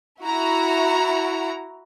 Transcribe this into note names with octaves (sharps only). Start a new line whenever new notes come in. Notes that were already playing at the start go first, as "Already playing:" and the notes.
E4 F#4 A#5